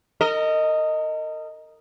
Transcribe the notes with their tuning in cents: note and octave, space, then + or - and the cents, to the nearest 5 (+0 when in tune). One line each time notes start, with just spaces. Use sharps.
A#4 -35 D#5 +0